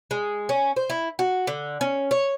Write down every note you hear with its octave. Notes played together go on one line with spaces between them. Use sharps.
G#3
C#4
C5
E4
F#4
D3
C#4
C#5